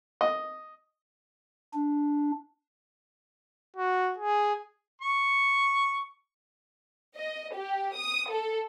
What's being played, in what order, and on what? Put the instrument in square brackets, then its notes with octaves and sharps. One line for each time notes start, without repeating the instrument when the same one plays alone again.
[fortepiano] D#5
[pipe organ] D4
[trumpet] F#4
G#4
[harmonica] C#6
[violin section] D#5
G4
D#6
A4